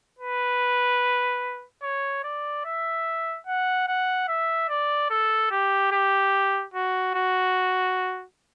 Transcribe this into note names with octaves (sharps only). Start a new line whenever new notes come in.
B4
C#5
D5
E5
F#5
F#5
E5
D5
A4
G4
G4
F#4
F#4